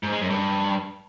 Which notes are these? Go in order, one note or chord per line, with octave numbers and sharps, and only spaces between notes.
G#2
G#3
F#2
G2